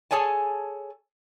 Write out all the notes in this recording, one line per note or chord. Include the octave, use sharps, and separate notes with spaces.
G#4 A4 C#5 G#5 A5